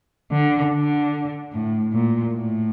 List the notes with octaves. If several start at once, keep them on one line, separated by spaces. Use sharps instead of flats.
D3
D3
A2
A#2
A2